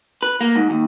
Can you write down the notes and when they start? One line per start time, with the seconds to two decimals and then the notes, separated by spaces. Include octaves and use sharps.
0.23 B4
0.41 A#3
0.56 G#2
0.70 D#2